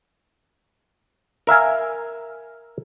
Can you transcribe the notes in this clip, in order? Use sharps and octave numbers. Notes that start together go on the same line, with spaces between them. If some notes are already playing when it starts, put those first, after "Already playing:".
A#4 E5 F5 G#5